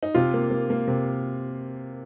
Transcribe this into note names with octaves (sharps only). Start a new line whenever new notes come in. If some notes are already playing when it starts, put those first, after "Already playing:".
D#4
C3 F4
A#3
A#3
A#3
C3